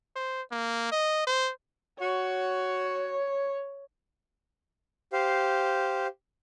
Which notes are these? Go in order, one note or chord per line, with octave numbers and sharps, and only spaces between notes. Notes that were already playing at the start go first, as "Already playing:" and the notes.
C5
A#3
D#5
C5
F#4 C#5
G4 C5 F5